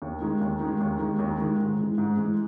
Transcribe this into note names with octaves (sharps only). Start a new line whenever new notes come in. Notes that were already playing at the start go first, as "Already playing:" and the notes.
D#2
D#3 G#3
D#2
D#3 G#3
D#2
D#3 G#3
D#2
D#3 G#3
G#2
E3 G#3
G#2
E3 G#3